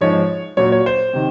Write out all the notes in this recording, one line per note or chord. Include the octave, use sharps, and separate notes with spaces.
G#2 F3 G#3 C#5
A#2 F#3 C#5
C#5
C5
C3 D#3